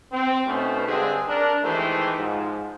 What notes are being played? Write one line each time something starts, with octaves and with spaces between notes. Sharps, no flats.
C4
B2 A3 B3 C#4 D#4 C5
G2 D3 G#3 C4 G4 G#4
D4 A#4
D#3 E3 G#3 A3 G4 C5
G#2 F3